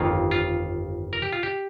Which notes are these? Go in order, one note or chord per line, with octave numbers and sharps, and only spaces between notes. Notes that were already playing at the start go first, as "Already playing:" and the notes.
Already playing: G1 F2 D#3 A#3 F4
F4
A#4
G4
F4
G4